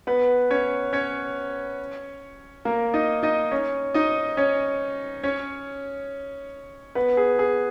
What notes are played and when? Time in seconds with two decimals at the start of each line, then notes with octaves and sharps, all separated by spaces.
0.07 B3 B4
0.50 C#4 C#5
0.93 C#4 C#5
2.65 A#3 A#4
2.94 D#4 D#5
3.23 D#4 D#5
3.51 C#4 C#5
3.94 D#4 D#5
4.37 C#4 C#5
5.23 C#4 C#5
6.95 B3 B4
7.17 G#4
7.39 G#4